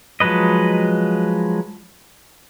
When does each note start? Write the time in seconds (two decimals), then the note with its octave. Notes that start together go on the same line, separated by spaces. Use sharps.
0.20 F3 F#3 G#3 B4 D#5